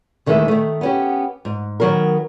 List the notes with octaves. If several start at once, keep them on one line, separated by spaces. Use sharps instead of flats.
D#2 D#3 E3 G#3 A3 E5
D#3 A3
B3 C#4 G4
G#2
D#3 F#3 B3 A#4